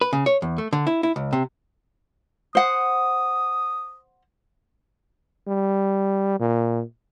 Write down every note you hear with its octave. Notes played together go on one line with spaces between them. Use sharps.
B4
C#3
C#5
E2
A3
D3
E4
E4
C#2
C3
C5 F#5 D#6
G3
A#2